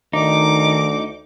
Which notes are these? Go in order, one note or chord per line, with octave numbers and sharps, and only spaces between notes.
D2 D#3 D#4 D6